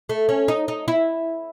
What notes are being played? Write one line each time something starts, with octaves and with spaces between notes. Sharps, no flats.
A3
C#4
D#4
D#4
E4